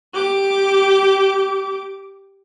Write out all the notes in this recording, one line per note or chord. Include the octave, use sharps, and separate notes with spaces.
G4 D6